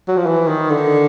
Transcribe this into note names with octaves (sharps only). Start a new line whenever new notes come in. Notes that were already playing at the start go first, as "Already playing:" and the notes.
F#3
F3
E3
D#3
D3